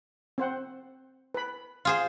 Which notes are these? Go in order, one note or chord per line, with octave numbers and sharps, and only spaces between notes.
C4 C5 F#5
B4 B5
F4 G#4 C5